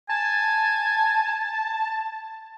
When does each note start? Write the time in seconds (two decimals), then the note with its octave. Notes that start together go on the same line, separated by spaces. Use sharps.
0.09 G#5 A5